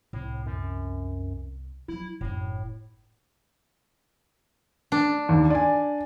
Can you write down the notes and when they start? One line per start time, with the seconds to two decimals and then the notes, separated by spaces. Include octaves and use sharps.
0.13 C2 A2
0.46 F#2
1.88 F3 F#3 E4
2.21 F#1 A2 D4
4.92 D4
5.29 D#2
5.50 D5 G#5